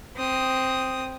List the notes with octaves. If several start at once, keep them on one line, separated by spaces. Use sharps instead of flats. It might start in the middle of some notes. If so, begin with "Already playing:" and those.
C4 D#6